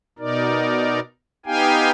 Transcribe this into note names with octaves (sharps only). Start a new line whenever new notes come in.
B2 D#4 A#4 D5
B3 D#4 G4 F5 G5 G#5